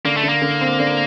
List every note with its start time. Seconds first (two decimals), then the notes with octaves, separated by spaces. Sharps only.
0.05 D3 A#3
0.17 A3
0.23 D3
0.29 A#3
0.42 D3
0.61 C4
0.79 D3